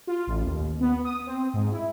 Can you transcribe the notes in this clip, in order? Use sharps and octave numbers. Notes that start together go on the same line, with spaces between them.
F4
A1
D#2
D#2
B3
D#6
C4
G#2
E4